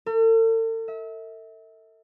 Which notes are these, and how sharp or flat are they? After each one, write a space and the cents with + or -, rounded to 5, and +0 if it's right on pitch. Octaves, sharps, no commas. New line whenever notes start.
A4 +45
E5 -35